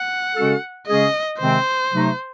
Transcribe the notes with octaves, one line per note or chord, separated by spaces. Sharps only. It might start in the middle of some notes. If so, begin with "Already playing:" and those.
Already playing: F#5
C#3 G#3 C#4 F#4 A4
C#3 G#3 C#4 G#4 D#5
C3 D#3 G#3 C4 C5
C3 F#3 A3 D#4